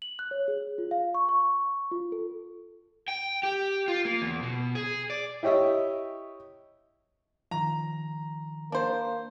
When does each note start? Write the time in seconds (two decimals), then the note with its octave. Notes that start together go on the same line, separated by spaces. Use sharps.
0.02 F#7
0.19 F#6
0.31 C#5
0.48 G#4
0.78 F4
0.91 F5
1.15 C#6
1.29 C#6
1.92 F4
2.12 A4
3.08 G5
3.43 G4
3.88 F4
4.05 A#3
4.22 E2
4.43 B2
4.75 G#4
5.10 D5
5.43 E4 G4 C#5 D#5 E5
7.51 D#3 F3 A#5
8.72 A#3 D4 C5